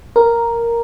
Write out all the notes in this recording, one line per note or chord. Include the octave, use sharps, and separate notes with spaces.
A#4